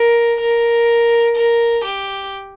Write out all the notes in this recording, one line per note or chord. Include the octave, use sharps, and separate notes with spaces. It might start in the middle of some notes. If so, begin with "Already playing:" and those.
Already playing: A#4
A#4
A#4
G4